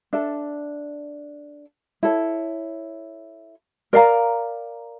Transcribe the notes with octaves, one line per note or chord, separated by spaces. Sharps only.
D4 A4 E5
E4 A4 C#5
A#4 D5 F5 A#5